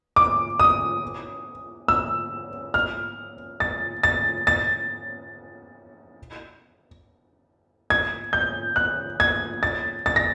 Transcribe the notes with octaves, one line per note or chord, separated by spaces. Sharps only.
D6
D#6
E6
F6
A6
A6
A6
G#6
G6
F#6
G#6
A6
A6
A#6